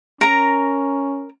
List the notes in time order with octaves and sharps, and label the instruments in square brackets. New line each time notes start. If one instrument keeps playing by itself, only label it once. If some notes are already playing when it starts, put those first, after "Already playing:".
[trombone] C#4 [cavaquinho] A#4 A#5